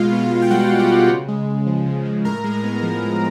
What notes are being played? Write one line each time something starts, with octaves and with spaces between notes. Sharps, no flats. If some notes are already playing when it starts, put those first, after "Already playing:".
Already playing: B2 G#3 F4 F5
B3
B2
G5
G3 F#4 F#5
B2
G4 G5
B3
C#3
G#3
C#3
F3
C#3
G#3
A2 A#4 A#5
G#3
B3
F3
A2